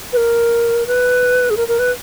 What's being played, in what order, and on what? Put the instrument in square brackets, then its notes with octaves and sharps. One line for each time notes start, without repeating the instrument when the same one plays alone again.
[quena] B4
A#4
B4
G#4
A#4
A#4
B4